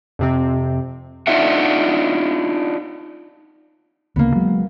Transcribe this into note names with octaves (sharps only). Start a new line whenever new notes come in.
F2 C3 C4
D4 D#4 F4 E5 F#5
D2 C#3 A#3 B3
F#3 G#3